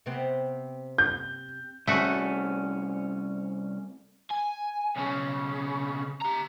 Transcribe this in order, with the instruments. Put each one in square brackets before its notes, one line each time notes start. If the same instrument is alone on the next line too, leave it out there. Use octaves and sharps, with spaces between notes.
[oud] C3 B3 C4
[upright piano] G6
[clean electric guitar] C2 C#4 [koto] A3 F#4
[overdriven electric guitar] G#5
B1 C#3
G4 A#5